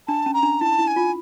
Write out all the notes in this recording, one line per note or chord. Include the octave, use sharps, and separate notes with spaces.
D4 A5
C#4
A#5
D4
E4 A5
E4
G#5
F4